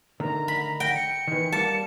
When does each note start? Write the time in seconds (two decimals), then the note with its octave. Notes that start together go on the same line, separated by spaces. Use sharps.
0.20 D3 D#3 A3 A#5
0.48 B5
0.80 G5 A#6
0.96 C#7
1.28 D#3 E3
1.52 G3 A#3 A5